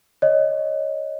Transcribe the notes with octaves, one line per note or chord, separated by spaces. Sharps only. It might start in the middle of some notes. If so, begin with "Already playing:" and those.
C#5 D#5